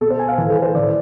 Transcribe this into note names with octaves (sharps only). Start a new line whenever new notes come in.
B2 A4
C5
G#5
F5
A2 E3 B4
A4
C5
A2 E3 D5